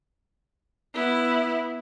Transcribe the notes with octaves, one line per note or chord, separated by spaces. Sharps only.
B3 E4